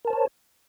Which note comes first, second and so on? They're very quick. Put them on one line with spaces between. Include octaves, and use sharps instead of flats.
A#4 A5 C5 C#5